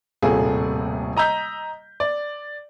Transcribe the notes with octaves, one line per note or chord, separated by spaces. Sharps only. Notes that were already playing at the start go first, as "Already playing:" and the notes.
D#1 A2 C3 A3 F4 G#4
D#5 A#5 E6 G6 B6
D5